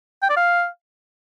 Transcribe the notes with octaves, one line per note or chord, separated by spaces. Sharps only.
G5
D5
F5